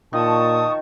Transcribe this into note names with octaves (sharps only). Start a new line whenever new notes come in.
A#2 D#3 F3 A5 C#6 D#6